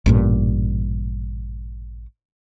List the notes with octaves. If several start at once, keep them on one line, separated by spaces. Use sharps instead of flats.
A1 G2 A#2